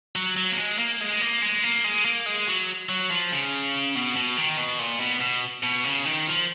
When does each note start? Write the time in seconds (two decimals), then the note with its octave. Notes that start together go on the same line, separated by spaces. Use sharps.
0.16 F#3
0.37 F#3
0.51 A#3
0.58 G#3
0.78 A#3
1.00 G#3
1.21 A#3
1.42 G#3
1.63 A#3
1.84 G#3
2.05 A#3
2.26 G#3
2.48 F#3
2.89 F#3
3.11 F3
3.31 C#3
3.95 B2
4.16 B2
4.38 D#3
4.58 B2
4.79 A#2
5.00 B2
5.21 B2
5.63 B2
5.85 C#3
6.06 D#3
6.27 F3